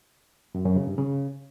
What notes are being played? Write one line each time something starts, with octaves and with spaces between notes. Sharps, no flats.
F#2
F#2
C#3
G2
C#3